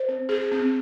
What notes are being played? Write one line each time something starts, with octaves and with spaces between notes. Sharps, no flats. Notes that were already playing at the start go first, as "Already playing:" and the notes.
Already playing: C5
C4
G#4
C4